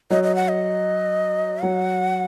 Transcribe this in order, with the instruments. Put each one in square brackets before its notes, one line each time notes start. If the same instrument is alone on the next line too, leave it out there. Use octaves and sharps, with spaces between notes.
[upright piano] F#3 [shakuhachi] D#5
[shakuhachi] D#5
F#5
D#5
[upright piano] F#3 [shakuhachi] F#5